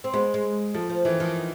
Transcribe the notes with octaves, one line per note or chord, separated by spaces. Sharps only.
C4
G#3 B3
G#3
F3 A3
F3
D#3 E3
D#3 F3